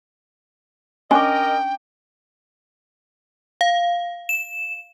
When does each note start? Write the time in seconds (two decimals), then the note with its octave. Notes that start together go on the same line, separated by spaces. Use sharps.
1.11 C#4 D4 A#4 D#5 G5 G#5 C#6 D6
3.61 F5
4.29 E7